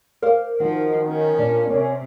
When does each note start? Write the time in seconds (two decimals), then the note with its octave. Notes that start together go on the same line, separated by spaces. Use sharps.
0.22 A#4 C5 D5 F5
0.60 D#3 F3 F#4
1.09 C#4
1.38 A#2 D4
1.70 C3 C#4 D5